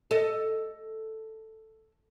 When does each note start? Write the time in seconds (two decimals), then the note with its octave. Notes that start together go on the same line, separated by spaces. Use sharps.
0.11 A4 D#5